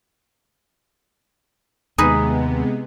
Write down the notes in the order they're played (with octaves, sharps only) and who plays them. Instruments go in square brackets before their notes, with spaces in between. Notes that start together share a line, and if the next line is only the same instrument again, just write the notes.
[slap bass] D#2 [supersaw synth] C3 G#3 B3 [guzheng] D#4 G#4 B4